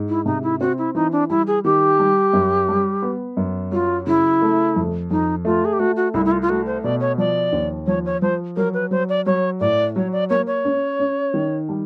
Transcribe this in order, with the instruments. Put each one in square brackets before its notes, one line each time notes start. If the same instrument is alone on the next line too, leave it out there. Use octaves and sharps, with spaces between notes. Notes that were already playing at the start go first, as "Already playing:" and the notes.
Already playing: [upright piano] G#2
[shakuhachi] E4
[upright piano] C3 [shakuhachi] D#4
[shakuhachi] E4
[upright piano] C4 [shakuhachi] F#4
[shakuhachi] E4
[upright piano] E3 [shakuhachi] D#4
[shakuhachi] D4
[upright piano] G3 [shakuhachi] E4
[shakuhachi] G#4
[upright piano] D#3 [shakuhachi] G4
[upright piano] G3
F#2
G3
B3
F#2
[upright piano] F#3 [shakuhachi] F4
[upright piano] C#3 [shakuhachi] E4
[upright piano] A3
F2
[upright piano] F2 [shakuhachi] D#4
[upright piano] A3 [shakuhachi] F4
[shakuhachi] G#4
G4
[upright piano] A3 [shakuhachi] F#4
[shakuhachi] F#4
[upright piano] C2 [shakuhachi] E4
[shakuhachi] E4
F4
F4
[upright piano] A3 [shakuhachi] F#4
[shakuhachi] C5
[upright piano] B2 [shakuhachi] D5
[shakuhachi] C#5
[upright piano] F3 [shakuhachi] D5
[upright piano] D#2
[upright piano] F3 [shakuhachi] C#5
[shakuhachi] C#5
[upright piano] F3 [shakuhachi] C5
[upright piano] F#3 [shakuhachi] A#4
[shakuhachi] B4
[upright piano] F#3 [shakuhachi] C5
[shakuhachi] D5
[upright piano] F#3 [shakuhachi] C#5
[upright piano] A2 [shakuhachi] D5
[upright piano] F#3 [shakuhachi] C#5
[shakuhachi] D5
[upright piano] A#3 [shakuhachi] C#5
[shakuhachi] C#5
[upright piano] C#4
C#4
D#3
G3